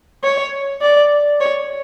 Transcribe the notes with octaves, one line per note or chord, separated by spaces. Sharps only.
C#5
D5
C#5